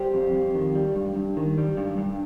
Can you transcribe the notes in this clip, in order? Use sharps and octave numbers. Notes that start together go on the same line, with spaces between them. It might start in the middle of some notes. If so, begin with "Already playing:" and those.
Already playing: G3 G4 C5
F2
F2
D#3
G3
G2
G2
D#3
G3
G2
G2